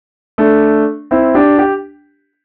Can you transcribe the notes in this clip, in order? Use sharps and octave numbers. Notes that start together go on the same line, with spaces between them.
A3 D4
C4 E4
D4 G4
G4